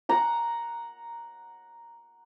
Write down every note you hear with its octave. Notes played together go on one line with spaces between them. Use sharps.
F#5 A#5